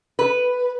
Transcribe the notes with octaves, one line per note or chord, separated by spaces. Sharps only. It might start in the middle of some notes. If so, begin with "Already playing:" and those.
B4